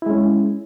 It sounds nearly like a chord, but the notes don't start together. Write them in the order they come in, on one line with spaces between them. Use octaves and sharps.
E4 G#3 C#4